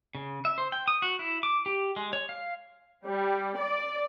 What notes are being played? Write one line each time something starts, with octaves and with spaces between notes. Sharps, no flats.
C#3
E5
C5
G5
D#6
F#4
E4
D6
G4
G#3
C#5
F5
G3
D5